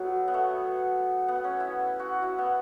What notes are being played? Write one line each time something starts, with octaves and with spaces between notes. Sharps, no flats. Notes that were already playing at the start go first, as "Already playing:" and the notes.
Already playing: F#3 A3 B3
B3
A3
B3
C#4
E4
F#4
E4
B3